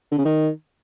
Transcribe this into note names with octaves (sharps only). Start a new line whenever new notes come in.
D3
C#3
D#3